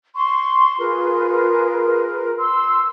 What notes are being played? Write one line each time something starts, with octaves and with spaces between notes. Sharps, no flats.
C6 C#6
F4 G#4 A#4 B4
C6 E6